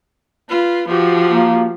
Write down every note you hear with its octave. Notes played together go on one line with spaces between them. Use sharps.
F4 B4
F3 F#4 G4
A#3